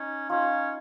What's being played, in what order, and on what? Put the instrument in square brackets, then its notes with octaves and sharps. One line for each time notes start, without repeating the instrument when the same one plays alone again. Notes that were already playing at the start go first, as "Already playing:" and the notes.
Already playing: [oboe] C#4 [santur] D#4
[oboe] C#4 [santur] D#4 F4